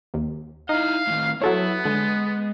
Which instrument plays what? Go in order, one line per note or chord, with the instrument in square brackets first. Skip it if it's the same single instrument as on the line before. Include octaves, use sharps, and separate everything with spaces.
[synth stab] D#2
[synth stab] D#4 [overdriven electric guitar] E4 D#5 [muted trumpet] F5
[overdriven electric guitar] A2 D#3
[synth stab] F#3 A4 C#5 [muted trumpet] B3 [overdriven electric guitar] E4
[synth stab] D3 [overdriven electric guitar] G#3